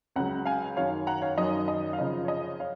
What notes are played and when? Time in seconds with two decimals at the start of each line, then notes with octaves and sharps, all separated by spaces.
0.16 C#2 C#3 F#3 F#5 A#5
0.45 F5 G#5
0.77 F#2 D#3 F#3 C#5 F5
1.07 F#5 A#5
1.22 C#5 F5
1.37 F#2 D#3 F#3 D#5
1.68 D#5
1.93 F5
1.98 F#2 C#3 F3 D#5
2.25 C#5
2.28 D#5
2.60 C#5 F5